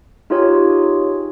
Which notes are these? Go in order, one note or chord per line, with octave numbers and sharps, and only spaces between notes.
D#4 F4 G4 G#4 C#5